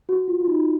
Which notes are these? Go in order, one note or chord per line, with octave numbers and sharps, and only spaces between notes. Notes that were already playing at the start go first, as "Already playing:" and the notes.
F#4
F4
F4
D#4